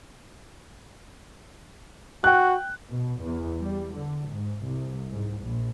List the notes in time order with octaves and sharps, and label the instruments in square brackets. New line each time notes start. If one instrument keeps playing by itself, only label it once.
[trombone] F#4 [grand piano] G5 F#6
[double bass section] B2
E2
G3
D3
G#2
C2
G#2
A#1